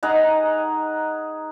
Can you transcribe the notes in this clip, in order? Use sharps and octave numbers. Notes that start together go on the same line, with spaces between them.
D#4 G#4 F#5 A#5